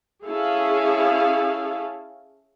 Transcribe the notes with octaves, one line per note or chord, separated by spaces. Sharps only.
C#4 E4 G#4 A4 F5